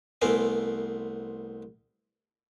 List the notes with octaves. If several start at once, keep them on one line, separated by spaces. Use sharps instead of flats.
C2 A3 B3 A#4 C5 G#5